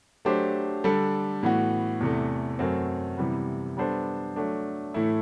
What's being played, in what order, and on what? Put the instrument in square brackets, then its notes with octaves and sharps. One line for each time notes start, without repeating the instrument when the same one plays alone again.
[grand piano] F#3 A3 D4 G4 C5
D3 G3 D4 A4
A2 E3 B3 F#4
E2 C3 E3 A3
F#2 F#3 A3 C4 F#4
C3 E3 G3 B3
G3 B3 D4 A4 C5
F#3 A3 D4
A2 E3 A3 E4 A4